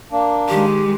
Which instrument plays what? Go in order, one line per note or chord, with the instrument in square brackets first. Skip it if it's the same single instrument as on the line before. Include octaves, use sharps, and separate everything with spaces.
[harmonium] A#3 D4
[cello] D#3 G#3 [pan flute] G4